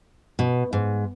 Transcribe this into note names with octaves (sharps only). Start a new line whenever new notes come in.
B2
G#2